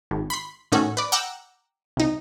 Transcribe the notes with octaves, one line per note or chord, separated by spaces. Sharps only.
G#1
B5 C6
A2 D#3 C#4 F#4 A4
B4 D5
F#5 G5 A#5 D6 E6
C2 D#4